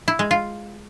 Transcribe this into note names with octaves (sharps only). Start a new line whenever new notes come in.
E4
G#3
F4